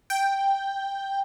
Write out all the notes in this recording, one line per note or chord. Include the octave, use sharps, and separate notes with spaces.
G5